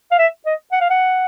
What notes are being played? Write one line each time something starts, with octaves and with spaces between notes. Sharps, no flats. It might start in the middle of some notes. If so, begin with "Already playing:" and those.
F5
E5
D#5
F#5
F5
F#5